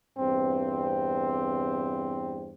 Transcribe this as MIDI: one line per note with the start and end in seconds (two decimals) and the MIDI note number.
0.18 2.54 40
0.18 2.54 43
0.18 2.54 60